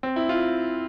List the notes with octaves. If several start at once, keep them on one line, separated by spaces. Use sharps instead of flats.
C4
E4
F4